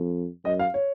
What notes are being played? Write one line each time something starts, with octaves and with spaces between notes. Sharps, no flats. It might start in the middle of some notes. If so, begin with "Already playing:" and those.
Already playing: F2
F#2 D#5
F5
C#5